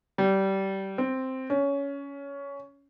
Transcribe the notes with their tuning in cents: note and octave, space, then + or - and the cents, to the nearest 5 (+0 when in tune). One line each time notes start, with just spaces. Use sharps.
G3 -20
C4 +0
C#4 +15